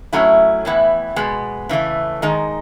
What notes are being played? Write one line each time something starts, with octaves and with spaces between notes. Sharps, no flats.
A2 F#3 A3 C#4 E4
A2 E3 B3 E4
B2 G#3 B3
C#3 E3 A3
D#3 G#3 D#4